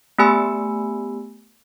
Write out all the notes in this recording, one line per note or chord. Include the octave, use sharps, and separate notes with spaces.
A3 B3 G4 G#5 B5 E6